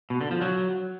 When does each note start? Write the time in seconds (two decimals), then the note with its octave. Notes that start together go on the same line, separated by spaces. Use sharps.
0.10 B2
0.21 D3
0.31 F3
0.41 F#3